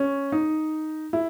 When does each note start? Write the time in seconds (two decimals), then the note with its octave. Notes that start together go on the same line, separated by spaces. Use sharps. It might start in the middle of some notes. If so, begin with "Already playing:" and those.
Already playing: C#4
0.32 D#4
1.13 E4